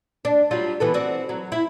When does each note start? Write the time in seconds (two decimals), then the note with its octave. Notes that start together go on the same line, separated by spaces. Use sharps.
0.25 D4
0.51 F#3 G3 F4
0.80 E3 B3 A4
0.94 C4 F#4 D5
1.29 F#3
1.52 E4